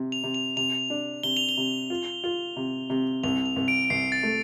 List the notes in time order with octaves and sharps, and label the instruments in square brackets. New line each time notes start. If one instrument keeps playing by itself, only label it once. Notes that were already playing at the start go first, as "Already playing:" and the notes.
Already playing: [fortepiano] C3
[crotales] F7
[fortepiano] C3
[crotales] F7
[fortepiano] C3 [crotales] F7
[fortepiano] D4
[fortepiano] C3 [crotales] G7
[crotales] F7
G7
[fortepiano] C3
F4
F4
C3
C3
[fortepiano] C2 [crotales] F7
[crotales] F7
[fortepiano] C2
[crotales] D7
D7
[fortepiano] C2 [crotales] C7
[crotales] A6
[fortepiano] A3